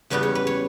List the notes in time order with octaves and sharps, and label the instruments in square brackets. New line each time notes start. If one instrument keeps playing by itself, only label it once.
[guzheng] E2 C#3 G3 B3 B4
C#5
B4
C#5